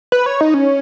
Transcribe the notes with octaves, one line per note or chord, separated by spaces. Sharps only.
B4
C#5
D#4
C#4